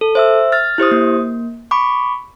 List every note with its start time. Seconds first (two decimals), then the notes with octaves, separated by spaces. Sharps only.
0.01 A4
0.15 C5 E5 E6
0.52 F6 A6
0.78 E4 G4 C5 D#6
0.91 A#3
1.71 B5 C#6 D6